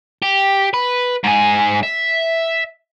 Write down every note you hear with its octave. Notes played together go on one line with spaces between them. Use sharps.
G4
B4
G#2 G#4
E5